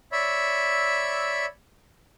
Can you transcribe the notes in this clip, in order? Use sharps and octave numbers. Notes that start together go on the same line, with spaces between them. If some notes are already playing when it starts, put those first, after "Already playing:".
C#5 D5 E5 B5 E6